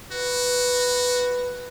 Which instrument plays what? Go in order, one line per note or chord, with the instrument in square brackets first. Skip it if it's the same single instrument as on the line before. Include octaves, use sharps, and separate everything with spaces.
[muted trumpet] F#4 [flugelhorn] B4